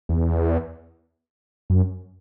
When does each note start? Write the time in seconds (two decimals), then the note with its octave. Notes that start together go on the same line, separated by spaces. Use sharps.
0.09 E2
1.70 F#2